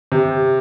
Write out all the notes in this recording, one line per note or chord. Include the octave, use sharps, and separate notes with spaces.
C3